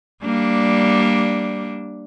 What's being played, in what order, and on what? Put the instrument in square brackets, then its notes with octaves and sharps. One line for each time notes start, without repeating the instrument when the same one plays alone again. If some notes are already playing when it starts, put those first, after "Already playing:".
[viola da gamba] G3 A#3 D4